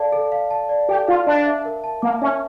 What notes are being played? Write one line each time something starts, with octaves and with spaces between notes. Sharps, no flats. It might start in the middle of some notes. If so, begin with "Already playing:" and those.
Already playing: A4 D5 F5 A5
A4
F5
A5
D5
G4 A4
F4 F5
D4 A5
E5
A#4
A5
A#3 D6
C#4 E5